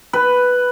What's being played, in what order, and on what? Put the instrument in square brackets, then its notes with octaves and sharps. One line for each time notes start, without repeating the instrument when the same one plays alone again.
[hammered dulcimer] B4